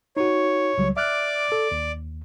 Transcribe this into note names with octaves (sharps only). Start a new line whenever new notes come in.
D#4 F#4 C#5
C#2 F#3 G3
D5 E5 D6 F6 F#6
A4
D#2